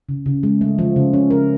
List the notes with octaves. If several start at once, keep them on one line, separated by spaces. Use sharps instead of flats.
C#3
C#3
G#3
A3
F3
C#3
C#4
A#4